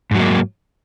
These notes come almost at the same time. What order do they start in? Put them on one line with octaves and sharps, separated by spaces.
G#2 F#3 A#3